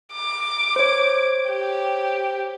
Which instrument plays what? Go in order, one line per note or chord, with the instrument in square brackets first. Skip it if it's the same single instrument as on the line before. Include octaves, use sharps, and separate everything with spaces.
[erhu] D6
[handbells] C5 C#5
[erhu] G4